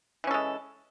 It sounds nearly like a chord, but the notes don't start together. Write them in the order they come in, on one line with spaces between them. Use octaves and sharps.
E3 C#4 A4 G#3